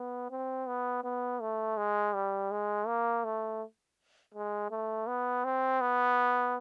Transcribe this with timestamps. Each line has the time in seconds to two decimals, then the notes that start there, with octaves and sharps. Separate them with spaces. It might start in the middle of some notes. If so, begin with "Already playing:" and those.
Already playing: B3
0.30 C4
0.68 B3
1.04 B3
1.41 A3
1.77 G#3
2.14 G3
2.51 G#3
2.87 A#3
3.24 A3
4.34 G#3
4.71 A3
5.07 B3
5.44 C4
5.81 B3